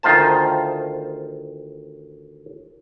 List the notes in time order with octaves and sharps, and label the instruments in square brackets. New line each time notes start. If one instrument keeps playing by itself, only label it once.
[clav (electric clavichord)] D2 D#3 F4 C5 A5